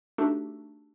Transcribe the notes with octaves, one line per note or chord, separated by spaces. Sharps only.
A3 D4 D#4 F#4 G4 A4